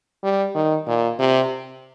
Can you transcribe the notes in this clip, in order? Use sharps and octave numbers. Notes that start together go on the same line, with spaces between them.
G3
D#3
A#2
C3